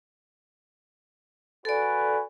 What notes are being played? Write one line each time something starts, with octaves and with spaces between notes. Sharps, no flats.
F#4 A4 B4 D5 G#5